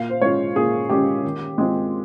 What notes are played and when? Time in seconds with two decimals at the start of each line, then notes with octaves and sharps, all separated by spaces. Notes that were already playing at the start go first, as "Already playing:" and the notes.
Already playing: A#2 F5
0.10 C5
0.21 G#3 C#4 F4 C#5
0.56 A#2 G#4
0.90 G#3 C#4 F4 G4
1.24 D#3
1.58 G#3 C4 F4